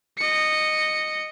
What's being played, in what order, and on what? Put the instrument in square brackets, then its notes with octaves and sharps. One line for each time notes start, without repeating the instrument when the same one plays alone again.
[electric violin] D#5 C#7